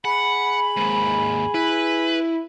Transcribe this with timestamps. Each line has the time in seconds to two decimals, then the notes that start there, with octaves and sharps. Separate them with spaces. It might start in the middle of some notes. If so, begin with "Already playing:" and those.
0.05 G#4 F#5 B5
0.77 D#2 G#2
1.54 E4 B4